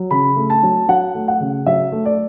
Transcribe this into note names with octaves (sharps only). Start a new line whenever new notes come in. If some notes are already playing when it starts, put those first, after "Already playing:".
Already playing: F#3
C#3 B5
A3
A5
F#3
F#3 F#5
A3
F#5
C#3
F#3 E5
A3
D5